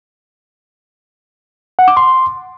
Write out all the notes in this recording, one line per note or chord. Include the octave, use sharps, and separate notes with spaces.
F#5
D6
C6